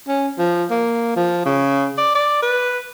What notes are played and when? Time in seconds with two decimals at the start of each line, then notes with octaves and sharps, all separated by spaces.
0.08 C#4
0.38 F3
0.70 A#3
1.16 F3
1.45 C#3
1.98 D5
2.15 D5
2.42 B4